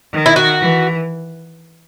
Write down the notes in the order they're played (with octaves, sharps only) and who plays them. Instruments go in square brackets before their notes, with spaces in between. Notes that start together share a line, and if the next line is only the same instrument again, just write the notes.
[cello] D#3
[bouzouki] E4
F#4
[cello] E3